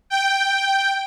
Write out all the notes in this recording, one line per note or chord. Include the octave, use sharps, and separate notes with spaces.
G5